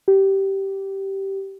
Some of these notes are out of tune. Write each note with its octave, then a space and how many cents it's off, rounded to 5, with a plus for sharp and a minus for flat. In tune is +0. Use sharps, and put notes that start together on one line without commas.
G4 -15